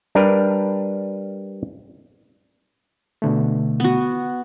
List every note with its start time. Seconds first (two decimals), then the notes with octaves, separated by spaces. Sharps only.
0.15 G3 D4 A#4 B4
3.22 B2 D3 A3
3.80 B3 F#4